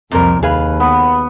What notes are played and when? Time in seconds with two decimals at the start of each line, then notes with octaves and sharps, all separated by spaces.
0.12 C2 F2 A#2 A#4
0.43 D#2 G#4 B4 F5
0.80 B3